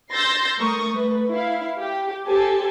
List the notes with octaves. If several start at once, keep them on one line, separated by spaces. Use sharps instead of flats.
C6 E6 G6 A6 A#6 C7
A3 A#4 C#6 D#6
A3 B4
E4 F5
G4
G4 A4 C5 G#5 A5